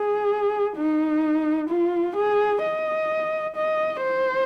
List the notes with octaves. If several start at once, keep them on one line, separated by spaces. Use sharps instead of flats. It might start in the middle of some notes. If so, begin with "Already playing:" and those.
Already playing: G#4
D#4
F4
G#4
D#5
D#5
C5